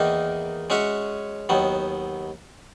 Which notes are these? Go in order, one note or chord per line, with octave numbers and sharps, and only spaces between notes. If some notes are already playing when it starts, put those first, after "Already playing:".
Already playing: E2 D#3 A#3 D#4
G#3 C#4 F#4 C#5 E5
D#2 D#3 F#3 B3